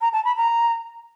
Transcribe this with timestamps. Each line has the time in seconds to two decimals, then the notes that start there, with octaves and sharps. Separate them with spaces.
0.01 A#5
0.13 A5
0.25 B5
0.37 A#5